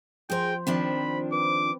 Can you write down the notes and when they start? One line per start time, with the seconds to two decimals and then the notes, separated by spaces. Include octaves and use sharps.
0.30 F3 G#4 A#4 C5 G5
0.67 D#3 F3 C4 D4 B5
1.32 B4 D6